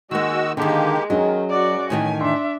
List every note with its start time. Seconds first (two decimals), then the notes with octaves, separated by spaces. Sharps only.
0.11 D#3 G#3 A#3 F#4 D#5 E6
0.57 D3 D#3 G#3 A#3 G4
1.10 D#3 F#3 C#4 G#4 D#5
1.50 F#2 F#4 D5
1.90 A2 D#3 E3 G#5
2.21 D4 E5 C6